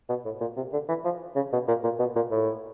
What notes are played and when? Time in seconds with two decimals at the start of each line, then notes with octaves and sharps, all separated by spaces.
0.09 B2
0.25 A2
0.40 A#2
0.56 C3
0.73 D3
0.88 E3
1.04 F3
1.35 C#3
1.52 B2
1.68 A#2
1.83 A#2
1.99 B2
2.15 A#2
2.31 A2